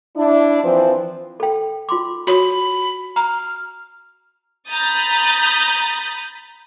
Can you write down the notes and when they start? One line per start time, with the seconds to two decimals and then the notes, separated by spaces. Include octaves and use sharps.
0.17 D4 E4 D5
0.63 E3 F3 C4 B4 C5
1.40 A4 G5
1.89 F4 C6 D6
2.27 F#4 C#5 B5 D#6
3.16 A#5 F6
4.69 A#5 B5 D#6 G6 A6